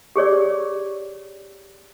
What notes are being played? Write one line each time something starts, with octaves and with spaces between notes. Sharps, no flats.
G4 G#4 C#5 D5